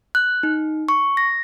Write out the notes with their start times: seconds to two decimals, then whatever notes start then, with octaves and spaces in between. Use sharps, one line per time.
0.15 F#6
0.43 D#4
0.89 C#6
1.17 A#6